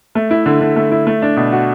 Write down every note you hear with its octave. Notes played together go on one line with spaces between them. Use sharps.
A3
E4
D3
D3
A3
E4
A3
D4
B2
F#4